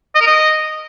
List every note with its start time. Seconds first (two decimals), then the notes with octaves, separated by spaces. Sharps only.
0.15 D#5
0.21 A#4
0.27 D#5